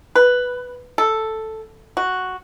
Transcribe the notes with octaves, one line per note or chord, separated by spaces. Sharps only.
B4
A4
F#4